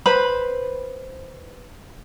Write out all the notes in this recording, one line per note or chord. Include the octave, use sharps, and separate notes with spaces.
B4 C5 B5